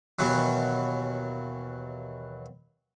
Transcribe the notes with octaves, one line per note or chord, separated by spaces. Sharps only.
D#2 B2 E3 F#3